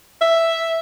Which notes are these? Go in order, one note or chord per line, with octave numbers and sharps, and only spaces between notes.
E5